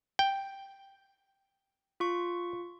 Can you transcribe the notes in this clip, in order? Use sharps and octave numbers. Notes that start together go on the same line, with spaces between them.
G5
F4 C#6